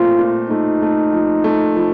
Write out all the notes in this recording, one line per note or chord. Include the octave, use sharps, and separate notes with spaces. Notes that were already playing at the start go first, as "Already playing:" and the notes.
Already playing: A#2 A3 C4 F4
A#2
A3 D#4
A3
F3
A3
F3